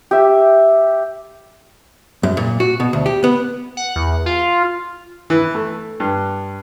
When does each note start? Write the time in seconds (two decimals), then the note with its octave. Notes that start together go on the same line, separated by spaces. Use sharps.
0.11 G4 E5
2.23 F#2
2.37 A#2
2.60 F#4
2.80 B2
2.93 D2
3.06 G4
3.24 B3
3.77 F#5
3.96 E2
4.26 F4
5.30 E3
5.55 A3
6.00 G2